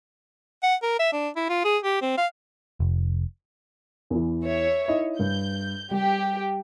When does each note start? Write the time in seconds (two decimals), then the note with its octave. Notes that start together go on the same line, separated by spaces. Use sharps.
0.63 F#5
0.83 A#4
0.99 E5
1.13 D4
1.36 E4
1.49 F4
1.64 G#4
1.83 G4
2.02 C4
2.18 F5
2.80 F1
4.10 E2 E3
4.44 C#5 E5
4.88 D#4 E4 D#5
5.19 G2 G6
5.91 G3 G4